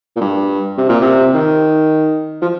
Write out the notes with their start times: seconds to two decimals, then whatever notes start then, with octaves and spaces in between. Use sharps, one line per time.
0.16 A#2
0.21 G2
0.78 C3
0.89 A#2
1.01 C3
1.34 D#3
2.42 F3